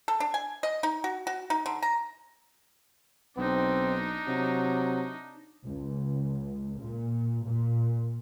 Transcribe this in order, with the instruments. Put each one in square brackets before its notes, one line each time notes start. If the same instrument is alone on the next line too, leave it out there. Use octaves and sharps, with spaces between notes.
[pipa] A4
D4
G#5
D#5
D#4
F#4
F#4
D#4
D3
A#5
[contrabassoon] B1 [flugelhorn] C4 [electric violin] D4 D#4
[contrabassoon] C3 [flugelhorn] F#3
[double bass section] C#2
A#2
A#2